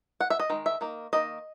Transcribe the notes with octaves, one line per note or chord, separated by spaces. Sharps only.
F#5
E5
D#5
D#3 G#3
E5
D#3 A#3
D#3 A#3 D#5